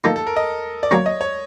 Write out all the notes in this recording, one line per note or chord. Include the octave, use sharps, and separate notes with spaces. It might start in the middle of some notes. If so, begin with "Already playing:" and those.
F3 A#3 D#4 A4
A4
A#4
D#5
D5
F#3 A#3 C#4 C#5
D#5
C#5